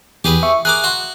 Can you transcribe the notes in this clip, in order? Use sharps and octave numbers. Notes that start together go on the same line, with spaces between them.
E2 G4 G#4 B4
E5 C#6
G#4 A#4 D6 F#6
F#4 F#5 C6